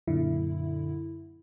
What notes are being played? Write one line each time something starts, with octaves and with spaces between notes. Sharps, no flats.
F#2 A#2 D3 E4